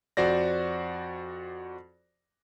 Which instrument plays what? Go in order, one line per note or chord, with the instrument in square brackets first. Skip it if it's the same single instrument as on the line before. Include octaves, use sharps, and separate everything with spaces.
[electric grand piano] F2 F#4 C5 D5 A#6